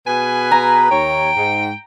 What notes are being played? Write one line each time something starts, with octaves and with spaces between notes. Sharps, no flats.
B2 G#4 B4 G#5
A#5
D#2 C#5 G5
G#2